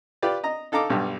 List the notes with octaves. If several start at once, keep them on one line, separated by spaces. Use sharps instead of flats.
F4 G4 B4 D5
D#5 A#5
D#4 A4 F5 A#5 D6
B1 G2 G4